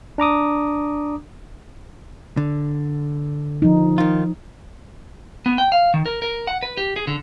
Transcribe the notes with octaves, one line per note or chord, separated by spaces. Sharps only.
D4 A#5 D6 D#6
D3
F3 D#4
D#3 F4
B3
G5
F5
D#3
A#4
A#4
F#5
B4
G4
G#4
D3